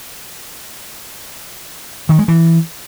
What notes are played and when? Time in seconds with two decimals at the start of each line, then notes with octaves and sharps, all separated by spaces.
2.09 D#3
2.19 G#3
2.28 E3